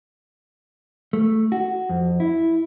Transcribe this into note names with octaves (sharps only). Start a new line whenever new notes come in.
A3
F#4
F2
E4